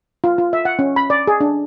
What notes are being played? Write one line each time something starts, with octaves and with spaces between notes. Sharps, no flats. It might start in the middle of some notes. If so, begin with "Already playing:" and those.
F4
F4
E5
F#5
C#4
B5
D5
G#4
D4